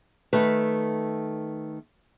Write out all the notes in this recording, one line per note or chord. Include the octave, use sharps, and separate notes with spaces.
D#3 A3 B4